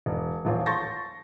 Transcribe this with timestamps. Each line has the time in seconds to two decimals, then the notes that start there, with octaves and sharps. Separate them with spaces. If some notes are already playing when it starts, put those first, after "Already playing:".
0.06 E1
0.45 D#1 A1 F4 C#5
0.66 A5 C6 C#6 G6 A6 A#6